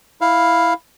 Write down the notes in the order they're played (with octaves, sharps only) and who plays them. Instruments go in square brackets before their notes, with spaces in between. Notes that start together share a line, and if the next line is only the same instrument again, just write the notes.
[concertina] E4 F5